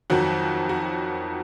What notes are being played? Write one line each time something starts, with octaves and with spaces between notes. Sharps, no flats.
F2 D#3 F#3 F#4
F#4